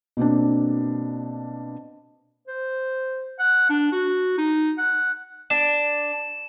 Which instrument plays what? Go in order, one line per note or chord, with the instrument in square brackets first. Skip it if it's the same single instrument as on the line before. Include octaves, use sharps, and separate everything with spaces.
[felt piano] B2 A#3 C4 D4
[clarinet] C5
F#5
D4
F#4
D#4
F#5
[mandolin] D4 [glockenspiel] E7